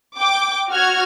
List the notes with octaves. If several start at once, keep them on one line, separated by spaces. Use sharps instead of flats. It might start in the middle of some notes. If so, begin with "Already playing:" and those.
G5 D6
F#4 F6 G#6